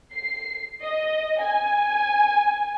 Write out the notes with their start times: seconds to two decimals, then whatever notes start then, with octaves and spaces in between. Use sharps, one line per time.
0.14 C7
0.81 D#5
1.39 G#5